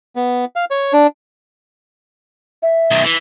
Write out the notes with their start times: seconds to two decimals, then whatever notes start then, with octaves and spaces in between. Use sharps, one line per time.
0.16 B3
0.56 F5
0.71 C#5
0.93 D4
2.63 E5
2.91 B1 D#3
3.04 E3